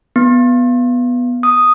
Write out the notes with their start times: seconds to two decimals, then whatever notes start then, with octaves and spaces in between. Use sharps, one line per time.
0.16 B3
1.43 D#6